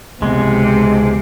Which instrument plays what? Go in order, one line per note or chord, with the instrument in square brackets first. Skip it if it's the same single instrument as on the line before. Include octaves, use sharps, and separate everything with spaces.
[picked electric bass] C#2 B3 [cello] C3 [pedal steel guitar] G#3